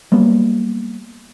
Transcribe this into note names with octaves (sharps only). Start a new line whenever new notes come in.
F#3 G3 A#3 B3